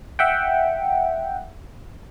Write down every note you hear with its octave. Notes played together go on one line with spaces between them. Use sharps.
E5 F#5 G5